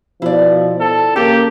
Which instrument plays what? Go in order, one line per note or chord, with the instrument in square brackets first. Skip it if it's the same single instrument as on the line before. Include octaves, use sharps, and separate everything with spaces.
[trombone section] B2 F3 [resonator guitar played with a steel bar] E4 D5
[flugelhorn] A4
[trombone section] C#3 A#3 [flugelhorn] G4 [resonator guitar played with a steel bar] A4